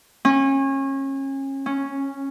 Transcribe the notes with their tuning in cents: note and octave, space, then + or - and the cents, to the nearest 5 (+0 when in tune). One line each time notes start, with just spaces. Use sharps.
C#4 -30
C#4 -5